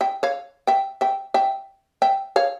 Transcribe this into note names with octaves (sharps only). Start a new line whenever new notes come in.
E5 G5
C#5 F5
E5 G5
E5 G5
E5 G5
E5 G5
C#5 F5